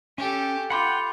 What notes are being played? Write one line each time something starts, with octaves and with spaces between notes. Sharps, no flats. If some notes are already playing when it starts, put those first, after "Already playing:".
C#4 G4 A4
F4 F#5 G5 B5 C6 D6